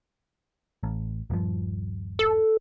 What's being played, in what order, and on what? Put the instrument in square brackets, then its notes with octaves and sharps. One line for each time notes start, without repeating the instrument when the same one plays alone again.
[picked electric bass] A1
D#1 G2 F3
[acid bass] A4